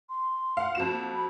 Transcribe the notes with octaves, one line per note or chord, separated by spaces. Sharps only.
C6
F5 F#5
F2 F#4 E7
A#3
B5